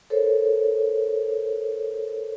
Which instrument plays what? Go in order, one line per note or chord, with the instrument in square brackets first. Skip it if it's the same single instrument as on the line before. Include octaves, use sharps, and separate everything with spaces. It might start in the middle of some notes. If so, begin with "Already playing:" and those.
[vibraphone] A4 A#4 C5 C#5